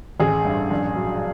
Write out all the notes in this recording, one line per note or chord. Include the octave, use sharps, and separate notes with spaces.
A1 G#4
G2
A#1
F#3